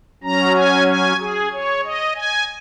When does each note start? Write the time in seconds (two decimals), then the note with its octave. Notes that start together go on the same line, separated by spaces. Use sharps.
0.23 F#3 C#4 A#5
0.56 G#5
0.87 G#5
1.20 G#4
1.52 C#5
1.84 D#5
2.16 G#5